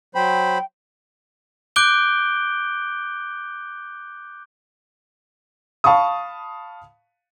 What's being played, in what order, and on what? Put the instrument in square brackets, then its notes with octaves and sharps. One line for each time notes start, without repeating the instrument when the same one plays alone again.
[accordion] F#3 C5 B5 [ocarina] G5
[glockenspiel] D6 F#6 G6 D7 G7
[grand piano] F5 A5 B5 C#6 D#6